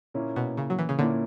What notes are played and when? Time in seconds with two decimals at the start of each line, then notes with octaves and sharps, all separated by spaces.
0.14 A#2 A#3 C#4 E4
0.36 B2
0.57 C#3
0.70 F#3
0.79 E3
0.89 C#3
0.99 A#2 D3 A#3 C#4 E4